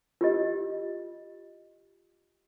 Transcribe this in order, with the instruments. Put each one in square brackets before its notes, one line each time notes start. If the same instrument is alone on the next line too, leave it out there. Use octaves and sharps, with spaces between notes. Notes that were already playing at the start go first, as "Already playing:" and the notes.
[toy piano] F4 G4 D#5